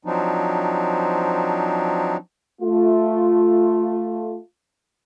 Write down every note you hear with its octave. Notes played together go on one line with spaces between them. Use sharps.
F3 F#3 C4 D4 D#4
A3 F4